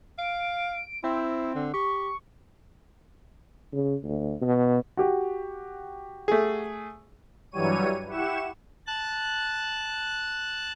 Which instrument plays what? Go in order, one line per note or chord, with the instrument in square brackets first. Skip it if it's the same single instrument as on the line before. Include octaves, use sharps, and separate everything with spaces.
[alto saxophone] F5 [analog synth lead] D7
[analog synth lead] C4 [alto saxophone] E4
[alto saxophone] D3
[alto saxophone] G4 [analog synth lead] C#6
[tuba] C#3
D2
B2
[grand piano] F#4 G4
[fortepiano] A3 G#4
[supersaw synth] G2 E3 F#3 G3 C#5 D#7
E4 G4 F#5 C#6 E7
[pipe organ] A5 F#6